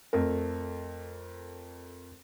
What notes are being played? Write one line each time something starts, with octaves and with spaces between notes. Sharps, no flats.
F2 A3 A#4